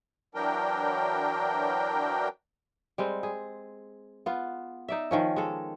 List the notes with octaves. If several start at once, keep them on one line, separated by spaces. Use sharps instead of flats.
E3 F#3 D4 A#4 G5
G3 G#3 C4
G#4
B3 F4
D#4 D5 E5
D#3 F3 C#4
G#3 A4